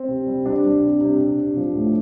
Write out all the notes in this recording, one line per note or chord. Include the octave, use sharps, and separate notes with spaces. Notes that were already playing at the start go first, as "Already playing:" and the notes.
Already playing: C4
C3
G3
C3 D4
G3
C3
C3
C3
C3
F3
A2